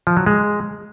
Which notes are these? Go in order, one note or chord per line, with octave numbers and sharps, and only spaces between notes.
F3
F#3
G#3